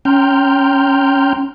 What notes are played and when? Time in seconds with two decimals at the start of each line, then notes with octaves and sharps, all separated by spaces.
0.05 C#4 G5 A#5 C6 F6 G6